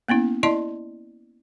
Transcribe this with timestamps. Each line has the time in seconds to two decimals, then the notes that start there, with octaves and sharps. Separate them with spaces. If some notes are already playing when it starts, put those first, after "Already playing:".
0.08 A#3 B3 C#4 E4
0.43 E4 D5 D#5 A5 C6